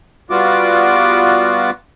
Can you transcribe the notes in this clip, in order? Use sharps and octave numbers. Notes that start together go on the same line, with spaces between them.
G3 B3 F4 F#4 D6